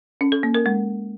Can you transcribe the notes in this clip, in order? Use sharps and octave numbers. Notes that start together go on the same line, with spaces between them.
C#4
A4
A#3
A#4
G#3